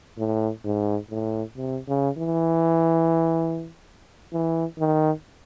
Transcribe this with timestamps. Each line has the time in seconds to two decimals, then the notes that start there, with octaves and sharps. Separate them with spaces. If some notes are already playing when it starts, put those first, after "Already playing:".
0.18 A2
0.65 G#2
1.11 A2
1.57 C3
1.88 C#3
2.18 E3
4.33 E3
4.79 D#3